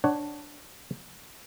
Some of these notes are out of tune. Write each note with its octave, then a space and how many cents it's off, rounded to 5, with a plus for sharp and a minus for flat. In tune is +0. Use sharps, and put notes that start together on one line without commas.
D4 +0 C#5 +0 F#5 +20